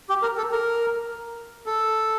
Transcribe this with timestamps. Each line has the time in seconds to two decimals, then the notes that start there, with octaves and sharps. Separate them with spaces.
0.09 G4
0.22 A#4
0.37 A4
0.52 A#4
1.66 A4